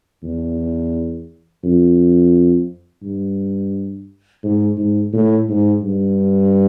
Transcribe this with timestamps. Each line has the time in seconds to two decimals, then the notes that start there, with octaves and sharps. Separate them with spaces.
0.24 E2
1.63 F2
3.03 G2
4.44 G#2
4.78 G#2
5.13 A2
5.49 G#2
5.83 G2